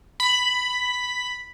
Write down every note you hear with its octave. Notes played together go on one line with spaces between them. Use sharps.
B5